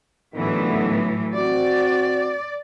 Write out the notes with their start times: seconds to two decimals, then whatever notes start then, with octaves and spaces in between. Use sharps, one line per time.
0.34 D#2 A2 D3 E3 F#3 B3
1.34 C4 F#4 D5